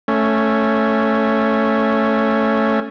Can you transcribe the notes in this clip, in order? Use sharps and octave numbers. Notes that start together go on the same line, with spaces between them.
A3 C#4